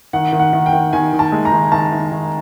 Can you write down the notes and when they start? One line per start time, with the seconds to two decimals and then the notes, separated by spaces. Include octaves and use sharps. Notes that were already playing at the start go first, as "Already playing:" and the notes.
0.13 D#3 F#5
0.33 D#3
0.39 F#5
0.53 D#3
0.66 G5
0.73 D#3
0.93 D#3 G#5
1.13 D#3
1.19 A5
1.32 G#3
1.45 A#5
1.52 D#3
1.72 D#3 A5
1.92 D#3
2.12 D#3